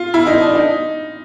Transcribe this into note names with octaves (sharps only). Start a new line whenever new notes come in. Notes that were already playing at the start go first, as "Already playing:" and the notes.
Already playing: F4
E4
D#4
D4
D#4